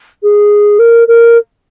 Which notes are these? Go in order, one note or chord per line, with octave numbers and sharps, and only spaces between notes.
G#4
A#4
A#4